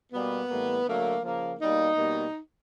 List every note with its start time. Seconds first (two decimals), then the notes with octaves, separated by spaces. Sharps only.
0.13 B2 G3 A#3 B3
0.49 A2 E3 G3 A#3
0.86 D3 F#3 A3 A#3
1.23 C#3 F3 A#3
1.60 B2 G3 A#3 D#4
1.97 B2 G3 A#3